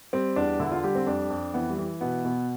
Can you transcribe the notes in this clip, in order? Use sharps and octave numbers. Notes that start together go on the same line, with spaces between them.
G3 C4
E2 D4
D3 E4
F4
G3 G4
C4
F2 D4
F2
E3 B3
G3
E3
B2 B3
B2